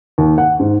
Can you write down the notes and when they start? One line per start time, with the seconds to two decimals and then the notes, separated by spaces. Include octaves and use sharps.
0.18 D#2
0.38 F#5
0.60 G#2